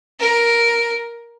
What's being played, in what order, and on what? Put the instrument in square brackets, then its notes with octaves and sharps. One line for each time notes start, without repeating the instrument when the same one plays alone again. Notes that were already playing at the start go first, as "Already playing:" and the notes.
[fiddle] A#4